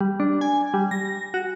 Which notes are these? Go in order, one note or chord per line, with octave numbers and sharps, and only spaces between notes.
G3
D4
G#5
G3
A#6
F#4